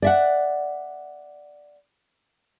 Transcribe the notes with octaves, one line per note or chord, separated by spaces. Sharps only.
D5 E5 F#5